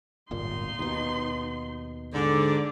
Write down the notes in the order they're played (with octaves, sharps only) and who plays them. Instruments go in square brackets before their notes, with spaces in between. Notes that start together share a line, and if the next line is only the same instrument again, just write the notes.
[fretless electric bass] D1 G1 A#2 [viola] D#4 C6
[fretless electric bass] D#2 B2
[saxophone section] G#2 D3 [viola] D5